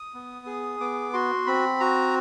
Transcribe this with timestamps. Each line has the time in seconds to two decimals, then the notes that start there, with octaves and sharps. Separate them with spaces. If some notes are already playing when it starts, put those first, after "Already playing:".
Already playing: D#6
0.14 B3
0.46 G#4
0.80 B3 D6
1.13 F#4 C6
1.46 C4 B5
1.80 F#4 A#5